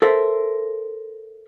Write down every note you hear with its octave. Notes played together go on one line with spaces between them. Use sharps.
A4 A#4 C5 E5